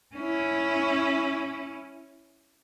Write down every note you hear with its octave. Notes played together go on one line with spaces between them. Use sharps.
C#4 E4